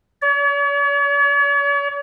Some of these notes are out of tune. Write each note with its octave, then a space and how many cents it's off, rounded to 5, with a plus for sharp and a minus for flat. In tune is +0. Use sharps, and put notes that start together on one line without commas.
C#5 +45